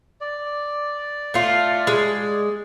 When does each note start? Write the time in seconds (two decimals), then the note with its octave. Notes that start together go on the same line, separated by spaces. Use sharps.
0.21 D5
1.34 A3 F4
1.87 G#3